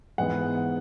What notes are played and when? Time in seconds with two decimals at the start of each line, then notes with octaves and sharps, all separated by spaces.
0.18 G#2 E3 G#3 B3 F#5